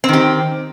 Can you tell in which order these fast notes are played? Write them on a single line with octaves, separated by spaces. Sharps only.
C4 D#3 G4